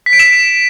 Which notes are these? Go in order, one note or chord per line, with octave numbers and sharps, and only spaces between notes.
B6
D7
E7